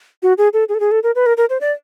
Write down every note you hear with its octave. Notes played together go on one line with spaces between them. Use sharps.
F#4
G#4
A4
G#4
A4
G#4
A4
A#4
B4
A#4
A#4
C5
D5